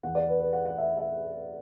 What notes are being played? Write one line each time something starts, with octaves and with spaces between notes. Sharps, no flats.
E2 E3 B3 F#5
D5
B4
B4
F#5
F#5
E5
E5